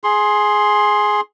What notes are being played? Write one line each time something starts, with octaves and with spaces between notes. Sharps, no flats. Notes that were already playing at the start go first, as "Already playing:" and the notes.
G#4 C6